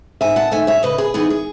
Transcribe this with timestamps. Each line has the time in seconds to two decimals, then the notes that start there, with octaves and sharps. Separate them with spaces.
0.21 G#2 E5 G#5
0.36 F#5 A5
0.52 D#3 A3 E5 G#5
0.67 C#5 E5
0.83 C#3 B4 D#5
0.98 G#4 B4
1.14 E3 B3 D#4 G#4
1.30 G#4